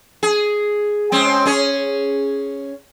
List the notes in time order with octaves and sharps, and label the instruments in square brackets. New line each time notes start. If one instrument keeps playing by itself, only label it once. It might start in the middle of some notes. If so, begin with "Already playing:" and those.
[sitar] G#4
G#3 C4 C#4
C#4 G#4 C#5